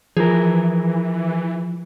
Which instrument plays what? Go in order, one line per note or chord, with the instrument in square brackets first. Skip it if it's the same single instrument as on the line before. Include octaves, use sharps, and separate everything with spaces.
[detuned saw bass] E3 [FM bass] F3 [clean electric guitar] G#4 A#4